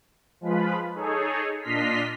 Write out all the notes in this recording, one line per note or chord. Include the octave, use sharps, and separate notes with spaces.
F3 G#3 F4 B4 B5
D#4 G#4 A4 C#5
A#2 D4 D#5 C6 F6 B6